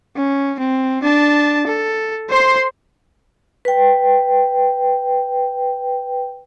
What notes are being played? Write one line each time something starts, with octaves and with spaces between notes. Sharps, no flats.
C#4
C4
D4 A5
A4
C5 C6
B4 G5